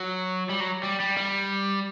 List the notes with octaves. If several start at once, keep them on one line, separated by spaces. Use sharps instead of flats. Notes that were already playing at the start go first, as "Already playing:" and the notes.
Already playing: F#3
G3
F#3
G3
G3
G3